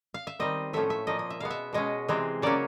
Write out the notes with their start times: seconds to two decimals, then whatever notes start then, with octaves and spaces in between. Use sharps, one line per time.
0.14 F5
0.27 E5
0.40 D#3 G3 C4 D#5
0.73 A2 F3 A3 C#4 E5
0.90 E5
1.07 A#2 F3 A#3 D#5
1.19 D#5
1.30 E5
1.40 B2 G#3 B3 F5
1.50 E5
1.73 B2 G#3 C#4 D#5
2.08 C3 E3 G#3 C4
2.42 C#3 F#3 A#3 C#4 D5